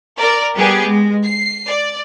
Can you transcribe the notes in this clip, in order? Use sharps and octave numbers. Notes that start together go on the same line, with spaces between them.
A#4 D5
G3 B3 G4 G#4
G#3
C7
D5